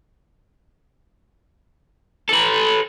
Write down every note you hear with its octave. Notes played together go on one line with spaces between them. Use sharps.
A4 B4